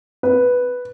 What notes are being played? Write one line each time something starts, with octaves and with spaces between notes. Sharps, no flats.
B4